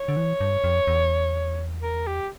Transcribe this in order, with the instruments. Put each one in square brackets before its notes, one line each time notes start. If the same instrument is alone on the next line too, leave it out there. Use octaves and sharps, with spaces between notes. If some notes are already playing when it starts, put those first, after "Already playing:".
Already playing: [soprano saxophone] C#5
[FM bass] D3
E3
G2
F2
E2
[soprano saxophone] A#4
G4